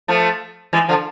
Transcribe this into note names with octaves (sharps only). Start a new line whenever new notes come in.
F3 A3
E3 G#3
D3 F3